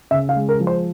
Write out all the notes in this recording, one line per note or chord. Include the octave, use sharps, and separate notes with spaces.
C#3 E5
F5
G#3
A#4
F3
C5